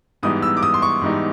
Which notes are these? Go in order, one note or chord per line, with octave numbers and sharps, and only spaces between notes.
G#2 E3 G3 B3 D#4 D#6
E6
D6
D#6
C6
C#6
G#2 E3 G3 B3 D#4